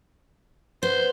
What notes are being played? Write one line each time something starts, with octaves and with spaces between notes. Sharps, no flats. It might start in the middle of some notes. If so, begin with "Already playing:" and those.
B3 C5